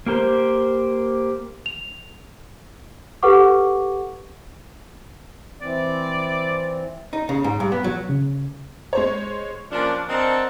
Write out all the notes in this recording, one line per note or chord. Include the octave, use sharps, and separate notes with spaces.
A#3 G4 A#4 C5
F7
G4 A4 B4 F#5 C#6 D6
E3 C4 D5
D#4
C#3
G#2
G2
B3
F#3
C#3
G#3 C5 C#5
F3 A#3 C#4 D4
C4 D4 A#4 D#5 F#5 A5